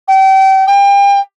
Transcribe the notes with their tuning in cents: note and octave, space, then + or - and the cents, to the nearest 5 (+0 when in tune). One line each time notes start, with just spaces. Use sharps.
G5 -30
G5 +35